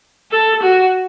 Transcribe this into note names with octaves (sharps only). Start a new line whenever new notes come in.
A4
F#4